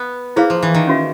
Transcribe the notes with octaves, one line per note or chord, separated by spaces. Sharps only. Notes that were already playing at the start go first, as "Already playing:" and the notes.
Already playing: B3
A#3 E4 G#4 C5 F5
F3
E3
D#3
C#4 F#4 B4 E5